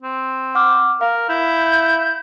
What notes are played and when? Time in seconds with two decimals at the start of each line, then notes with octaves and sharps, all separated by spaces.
0.03 C4
0.55 F#5 D6 F6
1.01 A#4 F5
1.29 E4 G6